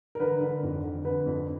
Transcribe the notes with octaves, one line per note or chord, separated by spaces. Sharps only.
A#4
D3 B4
D3
F2
D3
D3 B4
F2